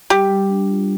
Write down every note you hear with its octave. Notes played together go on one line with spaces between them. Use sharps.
G3 G4
G3
D4
F4